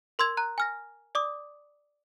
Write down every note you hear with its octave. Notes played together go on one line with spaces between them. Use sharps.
A#4 C6 E6 G#6 F7
A#5 F#6
G#5 F6 A#6
D5 D6 D#6